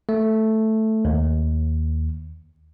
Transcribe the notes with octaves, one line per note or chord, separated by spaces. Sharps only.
A3
D#2